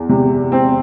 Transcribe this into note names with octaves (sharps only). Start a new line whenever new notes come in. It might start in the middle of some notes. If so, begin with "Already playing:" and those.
Already playing: E2
C3
C4